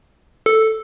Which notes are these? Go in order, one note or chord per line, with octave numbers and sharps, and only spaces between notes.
A4